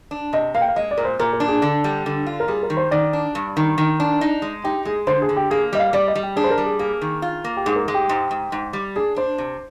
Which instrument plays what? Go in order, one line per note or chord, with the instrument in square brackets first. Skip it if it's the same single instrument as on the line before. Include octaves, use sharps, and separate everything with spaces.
[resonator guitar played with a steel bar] D4
[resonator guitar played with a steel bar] C3 [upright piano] D#5
[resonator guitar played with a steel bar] A#3 [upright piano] F5
[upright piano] G5
F5
[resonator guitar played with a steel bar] G#3 [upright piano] D#5
[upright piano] D5
[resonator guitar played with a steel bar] A#2 [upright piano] A#4
[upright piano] C5
[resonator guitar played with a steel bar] A#2 [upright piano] A#4
[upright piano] A#4
[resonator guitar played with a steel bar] D4
[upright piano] G#4
[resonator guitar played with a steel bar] D3
G3
D3
F4
[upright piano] A#4
[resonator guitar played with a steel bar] G3 [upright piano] G#4
[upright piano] A#4
[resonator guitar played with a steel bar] D#3
[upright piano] C5
[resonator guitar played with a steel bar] D#3 [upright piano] D5
[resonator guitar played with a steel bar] D4
G2
D#3
D#3
D4
D#4
G#3
[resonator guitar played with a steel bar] D#4 [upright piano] G4
[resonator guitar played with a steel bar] G#3 [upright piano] G#4
[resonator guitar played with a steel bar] D3 [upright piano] C5
[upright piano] G#4
[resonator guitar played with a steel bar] D3
[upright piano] G4
[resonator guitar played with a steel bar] A#3 [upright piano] G#4
[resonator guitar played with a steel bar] G3 [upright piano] D#5
[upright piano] F5
[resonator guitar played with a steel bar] G3 [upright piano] D5
[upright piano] D#5
[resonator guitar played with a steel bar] G3
[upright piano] G4
[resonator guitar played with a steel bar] D4 [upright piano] G#4
[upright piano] C5
A#4
[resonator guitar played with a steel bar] G3
[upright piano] G#4
[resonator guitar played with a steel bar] A#3 [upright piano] G#4
[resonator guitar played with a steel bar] D#3
F4
A#3
[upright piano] G4
[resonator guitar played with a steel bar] G#2 [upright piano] G#4
[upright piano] A#4
[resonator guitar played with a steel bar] G#3 [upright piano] G#4
[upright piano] G4
[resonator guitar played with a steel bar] G#2
G#2
G#2
G3
[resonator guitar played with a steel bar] D4 [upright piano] G#4
[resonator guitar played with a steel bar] D4 [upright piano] C5
[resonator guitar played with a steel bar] C3